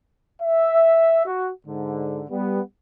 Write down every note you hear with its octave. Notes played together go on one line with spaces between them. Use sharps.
E5
F#4
G#2 D3
G3 B3